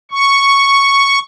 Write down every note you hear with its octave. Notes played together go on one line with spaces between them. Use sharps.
C#6